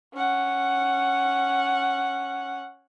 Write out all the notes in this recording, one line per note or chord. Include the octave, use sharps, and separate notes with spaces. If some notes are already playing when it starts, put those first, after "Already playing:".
C#4 F#5